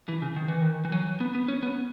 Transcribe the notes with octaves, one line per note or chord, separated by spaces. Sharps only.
E3
C#3
D#3
E3
D#3
E3
F#3
B3
B3
C#4
B3